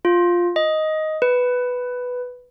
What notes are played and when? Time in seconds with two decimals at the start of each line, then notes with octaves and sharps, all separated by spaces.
0.05 F4
0.56 D#5
1.22 B4